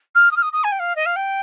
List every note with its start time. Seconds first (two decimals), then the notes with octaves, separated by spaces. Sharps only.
0.15 F6
0.31 D#6
0.36 F6
0.42 D#6
0.52 D#6
0.63 G#5
0.71 G5
0.79 F5
0.95 D#5
1.05 F5
1.16 G5